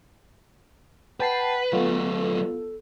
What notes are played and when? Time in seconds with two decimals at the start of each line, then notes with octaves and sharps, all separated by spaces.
1.20 B4 F#5 G5 A5 C7
1.73 F#3 A3 B3 F4 A4